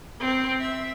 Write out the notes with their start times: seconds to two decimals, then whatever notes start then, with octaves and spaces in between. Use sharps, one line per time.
0.20 C4
0.60 E5